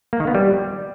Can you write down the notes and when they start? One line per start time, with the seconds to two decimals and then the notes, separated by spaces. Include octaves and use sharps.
0.13 A#3
0.20 D#3
0.27 B3
0.35 G3